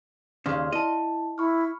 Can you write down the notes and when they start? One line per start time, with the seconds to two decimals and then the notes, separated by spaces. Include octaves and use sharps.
0.46 D#2 C#3 D5 C6 F6
0.73 E4 D#5 A5
1.38 E4 B5 C#6 F6